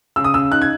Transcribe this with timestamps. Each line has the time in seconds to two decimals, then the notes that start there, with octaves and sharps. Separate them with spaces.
0.16 C#3 E6
0.24 D#6
0.34 C#3 E6
0.51 D#4 F#6
0.62 G#6